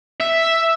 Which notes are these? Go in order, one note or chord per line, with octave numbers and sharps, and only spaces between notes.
E5